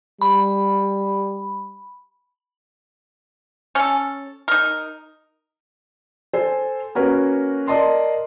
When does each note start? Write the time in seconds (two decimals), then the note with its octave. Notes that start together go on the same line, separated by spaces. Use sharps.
0.22 G3 B5
3.75 C#4 A4
4.48 D#4 A#4
6.33 A4 C5 G#5
6.95 A#3 C#4 F#4 A#4 B4
7.68 A#4 D5 D#5 A5 C6